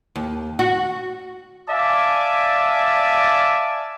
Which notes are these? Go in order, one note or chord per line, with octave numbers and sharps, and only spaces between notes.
D#2
F#4
D5 E5 F5 G#5 A5 D6